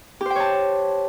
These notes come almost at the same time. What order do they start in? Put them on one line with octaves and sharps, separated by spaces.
G4 C5 G5 C#5 A5